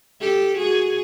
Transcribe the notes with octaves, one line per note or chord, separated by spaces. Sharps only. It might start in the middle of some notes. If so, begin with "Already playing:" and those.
G4 A4
F#4 G#4